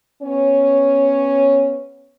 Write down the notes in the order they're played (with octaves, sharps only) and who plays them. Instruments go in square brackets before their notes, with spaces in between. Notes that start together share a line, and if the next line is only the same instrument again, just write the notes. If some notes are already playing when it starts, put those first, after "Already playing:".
[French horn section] B3 C#4 C#5